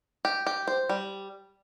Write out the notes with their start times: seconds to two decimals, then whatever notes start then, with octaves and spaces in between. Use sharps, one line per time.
0.25 G4
0.47 G4
0.68 C5
0.89 G3